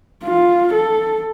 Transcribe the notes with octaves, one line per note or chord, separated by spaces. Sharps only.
F4
A4